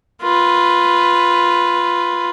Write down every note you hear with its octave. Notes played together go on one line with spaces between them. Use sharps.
F4 B4